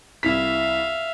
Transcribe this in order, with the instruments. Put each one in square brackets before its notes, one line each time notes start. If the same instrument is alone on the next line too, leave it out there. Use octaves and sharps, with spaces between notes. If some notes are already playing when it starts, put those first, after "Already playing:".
[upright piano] C2 E4 B6 [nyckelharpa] E5 F5